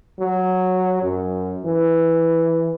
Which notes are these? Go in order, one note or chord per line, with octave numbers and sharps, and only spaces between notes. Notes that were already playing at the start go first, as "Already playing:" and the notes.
F#3
F#2
E3